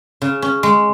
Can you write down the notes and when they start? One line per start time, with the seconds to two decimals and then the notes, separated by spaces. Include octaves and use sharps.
0.22 C#3
0.42 C#4
0.63 G#3